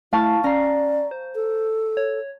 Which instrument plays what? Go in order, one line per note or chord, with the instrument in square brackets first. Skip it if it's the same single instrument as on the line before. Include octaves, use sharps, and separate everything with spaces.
[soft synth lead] A3 [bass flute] E4 [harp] F5 A5 C#6
[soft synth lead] C#4 [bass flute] D5 [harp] A#5 C7
[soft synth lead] C5
[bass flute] A4
[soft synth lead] C#5